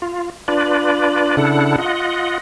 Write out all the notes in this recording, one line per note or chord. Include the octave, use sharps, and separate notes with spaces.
F4
D4 F4 B4 D5
C#3 D4 E4 A4 F#5
F4 D#5 F#5